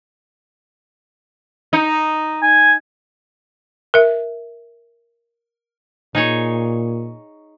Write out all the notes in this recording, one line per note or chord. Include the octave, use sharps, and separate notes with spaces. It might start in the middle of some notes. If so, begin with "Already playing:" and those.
D#4
G#5
A#4 E5
A#2 D#4 G#4 C#5